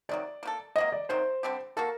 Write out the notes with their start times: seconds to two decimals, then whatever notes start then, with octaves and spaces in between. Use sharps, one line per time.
0.09 C3 D#3 F#3 D5
0.43 A#3 F#4 A4
0.76 C3 F#3 A#3 D#5
0.92 D5
1.09 C3 D#3 F#3 C5
1.43 D3 G3 C4 G4
1.77 A#3 F#4 A4 A#4